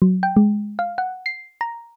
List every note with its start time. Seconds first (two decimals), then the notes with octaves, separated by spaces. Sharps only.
0.02 F#3
0.23 G5
0.36 G#3
0.79 F5
0.98 F#5
1.26 C7
1.61 A#5